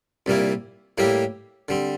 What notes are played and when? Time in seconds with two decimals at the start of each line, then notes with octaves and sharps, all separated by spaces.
0.26 C2 A#2 G3 A#3 E4
0.98 A2 G3 A#3 E4 G4
1.68 D3 G3 C4